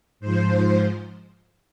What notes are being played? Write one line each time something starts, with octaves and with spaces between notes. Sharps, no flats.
G#2 F3 C5